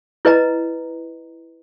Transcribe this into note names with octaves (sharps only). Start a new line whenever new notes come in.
E4 B4 D#5 A#5